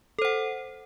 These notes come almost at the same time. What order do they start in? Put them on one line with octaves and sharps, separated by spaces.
A4 C5 F#5